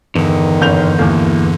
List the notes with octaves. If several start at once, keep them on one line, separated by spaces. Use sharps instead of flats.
E2 G2 D3 D#3
F#1 G6 F7
D#2 E3 A#3